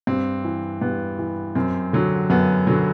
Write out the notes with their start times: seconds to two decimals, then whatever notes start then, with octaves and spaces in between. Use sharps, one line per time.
0.07 G2 C4
0.44 E3
0.82 G2 B3
1.19 E3
1.55 F#2 C4
1.93 D3 F#3
2.30 F#2 B3
2.67 D3 F#3